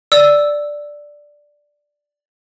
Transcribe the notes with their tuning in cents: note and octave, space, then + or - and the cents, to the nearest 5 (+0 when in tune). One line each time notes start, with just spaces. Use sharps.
D5 +0 E6 +0